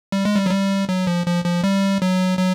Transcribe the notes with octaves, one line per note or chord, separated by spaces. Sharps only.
G3
G#3
G3
F#3
G3
F#3
F3
F3
F3
G3
F#3
F#3